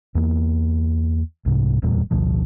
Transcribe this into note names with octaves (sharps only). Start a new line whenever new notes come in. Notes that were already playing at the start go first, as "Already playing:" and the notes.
E2 A#3
C2 G#2 C3
D1 E2 A#2 G3
A1 D2 B2 F3